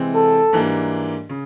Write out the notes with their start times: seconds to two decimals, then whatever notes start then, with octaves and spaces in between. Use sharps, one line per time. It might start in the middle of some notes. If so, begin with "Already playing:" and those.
Already playing: C3 E3 G#3 C4
0.15 A4
0.53 G#2 E3 G3 A#3 D4
1.29 C#3